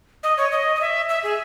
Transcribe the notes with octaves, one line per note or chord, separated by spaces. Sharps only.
D#5
C#5
D#5
D#5
E5
E5
G#4